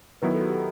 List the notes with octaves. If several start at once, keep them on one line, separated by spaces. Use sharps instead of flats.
D#3 F#3 B3 E4 B4
A4
F#4
G4
A4